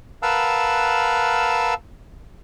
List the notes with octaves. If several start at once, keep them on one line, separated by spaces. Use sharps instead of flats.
A#4 B4 F5 F#5 A5 E6